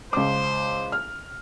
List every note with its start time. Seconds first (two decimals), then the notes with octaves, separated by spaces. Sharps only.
0.13 C#2 C5 D6
0.92 F6